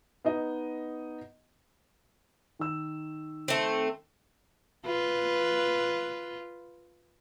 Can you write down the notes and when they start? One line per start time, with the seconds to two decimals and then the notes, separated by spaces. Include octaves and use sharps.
0.24 B3 D#4 D#5
2.59 D#3 E6
3.48 A3 C4
4.86 F4 B4